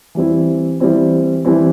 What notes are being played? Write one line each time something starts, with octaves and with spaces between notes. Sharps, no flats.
E3 G3 C4 E4
E3 G3 C4 E4
E3 G3 C4 E4